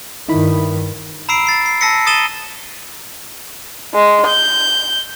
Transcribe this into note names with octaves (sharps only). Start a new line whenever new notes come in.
G2 D#3 D#4 E4 B5
A#5 B5 E6 C7 D7
A6 C7
C7
A5 E6 A#6 B6 C#7
D#6 A6 D#7 E7 G7
G#3
G6